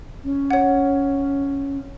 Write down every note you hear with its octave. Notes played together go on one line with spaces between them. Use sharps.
C#4
C#5 F#5